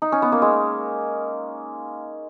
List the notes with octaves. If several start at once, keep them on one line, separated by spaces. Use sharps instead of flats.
D#4
C#4
B3
A#3
G#3